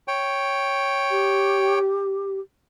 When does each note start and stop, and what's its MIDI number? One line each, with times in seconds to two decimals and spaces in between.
0.08 1.79 73
0.08 1.79 79
1.10 2.40 67